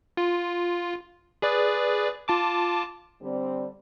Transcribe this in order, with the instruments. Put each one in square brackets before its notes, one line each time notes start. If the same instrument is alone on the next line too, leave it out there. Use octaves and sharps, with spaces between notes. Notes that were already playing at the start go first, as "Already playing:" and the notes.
[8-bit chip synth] F4
G#4 B4 D5
F4 A5 D6
[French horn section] D3 G3 C4